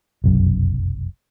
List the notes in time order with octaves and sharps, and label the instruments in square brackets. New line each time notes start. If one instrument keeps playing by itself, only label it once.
[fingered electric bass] F1 B1 F#2